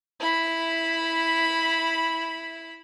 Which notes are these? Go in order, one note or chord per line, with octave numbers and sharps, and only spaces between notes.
E4 B5